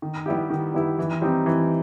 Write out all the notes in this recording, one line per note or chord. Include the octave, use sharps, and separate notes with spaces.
D#3
G3 B3 E4 G4
D#3
G3 B3 E4 G4
E3
G3 C4 D#4 G4
E3